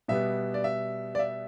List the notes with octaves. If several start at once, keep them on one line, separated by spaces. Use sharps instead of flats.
B2 G3 B3 E5
D5
E5
D5
E5